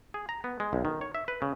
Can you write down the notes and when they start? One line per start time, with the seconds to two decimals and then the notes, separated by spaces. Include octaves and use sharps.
0.14 G#4
0.29 A#5
0.44 B3
0.60 G#3
0.73 B1
0.85 D#3
1.01 C#5
1.15 E5
1.28 B4
1.42 C#3